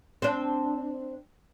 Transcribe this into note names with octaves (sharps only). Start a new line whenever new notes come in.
C4 D4